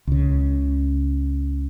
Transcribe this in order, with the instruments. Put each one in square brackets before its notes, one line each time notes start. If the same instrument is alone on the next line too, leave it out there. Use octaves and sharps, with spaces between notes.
[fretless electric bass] C#2 C#3